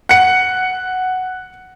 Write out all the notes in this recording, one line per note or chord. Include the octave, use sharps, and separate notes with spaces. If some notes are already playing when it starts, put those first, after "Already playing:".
F#5 C#7